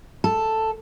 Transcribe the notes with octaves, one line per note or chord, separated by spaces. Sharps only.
A4